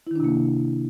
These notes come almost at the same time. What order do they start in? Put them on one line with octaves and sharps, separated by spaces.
E4 D#3 D4 C3 A#3